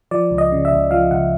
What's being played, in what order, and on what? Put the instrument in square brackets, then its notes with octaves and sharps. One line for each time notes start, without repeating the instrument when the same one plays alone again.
[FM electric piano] F3 D5
C#2
D#5
C#3
E5
C#2
F3 F5
C#2 F#5